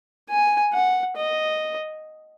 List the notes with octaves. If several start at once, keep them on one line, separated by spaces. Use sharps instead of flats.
G#5
F#5
D#5